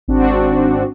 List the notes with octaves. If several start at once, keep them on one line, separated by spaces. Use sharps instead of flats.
G#1 C4 D4 F#4